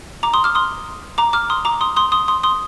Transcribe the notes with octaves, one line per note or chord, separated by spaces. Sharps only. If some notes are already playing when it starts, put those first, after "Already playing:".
A#5 D6
C6 D#6
D6 F6
C6 D#6
A#5 D6
D6 F6
C6 D#6
A#5 D6
C6 D#6
C6 D#6
C6 D#6
C6 D#6
C6 D#6